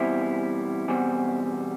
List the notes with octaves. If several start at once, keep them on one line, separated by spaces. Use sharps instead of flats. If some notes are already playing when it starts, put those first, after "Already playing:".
Already playing: E2 B2 G3 C4 E4
E2 B2 G3 C4